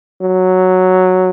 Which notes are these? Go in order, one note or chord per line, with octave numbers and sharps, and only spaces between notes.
F#3